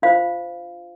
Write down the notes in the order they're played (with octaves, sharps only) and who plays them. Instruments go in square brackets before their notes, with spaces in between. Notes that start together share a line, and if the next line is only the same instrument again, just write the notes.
[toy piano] D4 F4 C5 F5